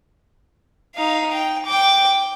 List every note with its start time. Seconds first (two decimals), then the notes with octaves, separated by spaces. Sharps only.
0.95 D#4 F5
1.32 G5
1.66 G5 D6